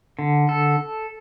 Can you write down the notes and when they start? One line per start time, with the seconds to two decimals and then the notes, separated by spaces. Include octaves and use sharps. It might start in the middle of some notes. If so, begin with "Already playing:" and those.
0.19 D3
0.49 A4